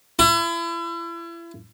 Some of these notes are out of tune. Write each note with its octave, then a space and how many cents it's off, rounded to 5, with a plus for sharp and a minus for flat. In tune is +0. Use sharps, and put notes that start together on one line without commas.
E4 +35